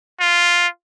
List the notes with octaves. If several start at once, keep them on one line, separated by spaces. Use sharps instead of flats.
F4